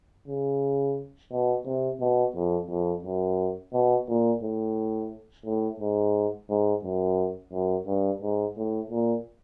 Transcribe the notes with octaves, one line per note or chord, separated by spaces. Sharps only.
C#3
B2
C3
B2
F2
F2
F#2
B2
A#2
A2
A2
G#2
G#2
F#2
F#2
G2
G#2
A2
A#2